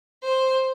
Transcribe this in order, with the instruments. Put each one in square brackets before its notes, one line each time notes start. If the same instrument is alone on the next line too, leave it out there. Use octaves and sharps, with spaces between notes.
[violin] C5